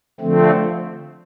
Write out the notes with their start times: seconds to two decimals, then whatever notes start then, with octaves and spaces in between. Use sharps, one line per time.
0.20 D3 F3 A3 C4